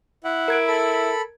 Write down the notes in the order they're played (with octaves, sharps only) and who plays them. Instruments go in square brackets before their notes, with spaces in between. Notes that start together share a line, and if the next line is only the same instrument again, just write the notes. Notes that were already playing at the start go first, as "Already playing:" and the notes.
[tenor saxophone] E4 [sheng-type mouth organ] F#5
[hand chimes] A#4 G#6 D7
[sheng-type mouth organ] A4 B5